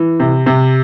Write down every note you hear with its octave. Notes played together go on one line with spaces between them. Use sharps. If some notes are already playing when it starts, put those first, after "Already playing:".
Already playing: E3
C3
C3